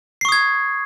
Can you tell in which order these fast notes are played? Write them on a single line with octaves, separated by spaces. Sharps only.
C7 C#6 D#6 G#6